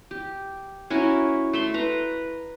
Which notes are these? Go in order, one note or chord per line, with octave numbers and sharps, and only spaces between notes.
G4
C#4 E4 F#4 A#4
A3 E5 C6
B4 A#5